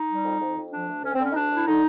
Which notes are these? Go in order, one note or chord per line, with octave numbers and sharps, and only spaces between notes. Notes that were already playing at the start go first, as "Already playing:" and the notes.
Already playing: D#4
G3
F2
F2
F2
F3 D4
D2
D2 C#4
C4
D3 C#4
D#4
D2 D4
D2 E4
D3 D#4